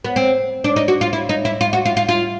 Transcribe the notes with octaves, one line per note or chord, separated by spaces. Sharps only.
B3
C4
D4
D#4
F#4
F4
E4
D#4
E4
F4
F#4
F4
F4
F4